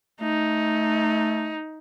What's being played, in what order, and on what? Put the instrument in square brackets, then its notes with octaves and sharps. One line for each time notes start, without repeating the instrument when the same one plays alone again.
[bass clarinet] A3 [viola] D#4